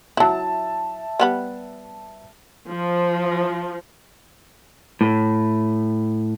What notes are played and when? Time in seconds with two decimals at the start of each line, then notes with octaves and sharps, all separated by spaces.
0.17 F#3 E4 E5 A5
1.20 G3 B3 B5
2.69 F3
5.01 A2